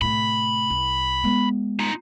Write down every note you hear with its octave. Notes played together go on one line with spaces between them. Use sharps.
A2 C3 B5
C2
G#3 B3
D#4 F4